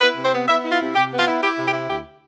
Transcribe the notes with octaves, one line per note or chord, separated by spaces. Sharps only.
B3 E4 B4
C3
C4 C5
B3
B3 E4 E5
E4
F4
C3
C3 G4
B3
F4
E4
E4 G4
C3
G4
E4
D2 G4